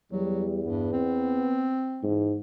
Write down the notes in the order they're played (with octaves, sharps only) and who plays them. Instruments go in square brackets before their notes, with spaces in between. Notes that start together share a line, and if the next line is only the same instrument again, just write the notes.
[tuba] E2 [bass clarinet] F#3 [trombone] G3
[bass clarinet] G2 [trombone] B3
[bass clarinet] C4
[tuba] G#2 [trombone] E3